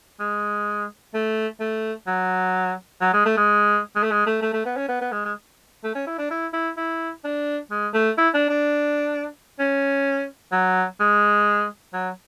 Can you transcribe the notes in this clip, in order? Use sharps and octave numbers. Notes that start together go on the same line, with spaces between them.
G#3
A3
A3
F#3
F#3
G#3
A3
G#3
G#3
A3
G#3
A3
A3
A3
B3
C#4
B3
B3
G#3
G#3
A3
C#4
E4
D4
E4
E4
E4
D4
G#3
A3
E4
D4
D4
C#4
F#3
G#3
F#3